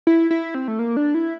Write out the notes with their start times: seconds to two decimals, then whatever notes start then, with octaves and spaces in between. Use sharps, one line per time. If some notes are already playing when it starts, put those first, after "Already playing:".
0.07 E4
0.31 E4
0.55 C4
0.68 A3
0.79 A#3
0.97 D4
1.14 E4